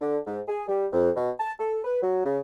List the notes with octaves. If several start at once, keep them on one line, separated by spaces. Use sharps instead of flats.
D3
G#2
G#4
G3
F2
B2
A5
A4
B4
F#3
C#3